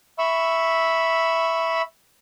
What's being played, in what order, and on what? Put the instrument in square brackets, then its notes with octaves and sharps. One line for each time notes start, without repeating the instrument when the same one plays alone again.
[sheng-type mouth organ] E5 B5 C#6 E6